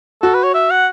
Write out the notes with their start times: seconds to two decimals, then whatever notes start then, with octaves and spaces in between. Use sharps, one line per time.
0.22 F#4 A4
0.34 B4
0.44 C#5
0.54 E5
0.71 F#5